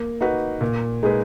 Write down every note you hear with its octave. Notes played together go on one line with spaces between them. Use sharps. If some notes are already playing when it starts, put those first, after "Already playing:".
Already playing: A#3
D#4 F#4 B4
A#2
G#3 D#4 G#4 B4